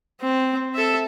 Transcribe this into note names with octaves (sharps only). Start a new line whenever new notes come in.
C4
A4 E5